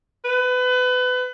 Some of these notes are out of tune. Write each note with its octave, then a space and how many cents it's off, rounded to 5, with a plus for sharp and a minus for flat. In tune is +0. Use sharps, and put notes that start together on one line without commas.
B4 +25